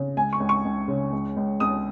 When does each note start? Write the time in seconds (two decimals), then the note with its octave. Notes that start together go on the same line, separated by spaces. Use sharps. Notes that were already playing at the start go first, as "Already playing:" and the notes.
Already playing: C#3
0.17 C#2 G#5
0.33 C#6
0.40 C#2
0.49 C#6
0.65 C#2
0.88 C#3
1.13 C#2
1.37 C#2
1.60 C#2 D#6